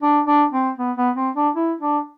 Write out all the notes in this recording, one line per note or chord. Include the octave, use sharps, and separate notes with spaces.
D4
D4
C4
B3
B3
C4
D4
E4
D4